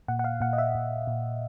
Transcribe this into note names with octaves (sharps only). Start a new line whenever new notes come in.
A#2 F#5
F#5
F5
A#2 F#5
D#5
E5
A#2
A#2